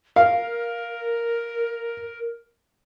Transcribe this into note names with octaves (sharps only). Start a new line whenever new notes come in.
A#4 F5